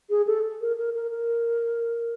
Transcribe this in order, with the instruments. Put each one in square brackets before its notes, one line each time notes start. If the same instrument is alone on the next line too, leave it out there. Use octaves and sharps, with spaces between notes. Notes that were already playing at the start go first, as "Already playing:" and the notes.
[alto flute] G#4
A4
A#4
A#4
A#4
A#4